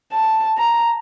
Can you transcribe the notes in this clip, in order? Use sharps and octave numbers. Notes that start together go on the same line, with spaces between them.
A5
A#5